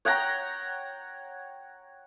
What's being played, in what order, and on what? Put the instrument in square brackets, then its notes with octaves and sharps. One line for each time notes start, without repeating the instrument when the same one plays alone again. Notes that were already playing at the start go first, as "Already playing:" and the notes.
[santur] C#5 F#5 G5 A#5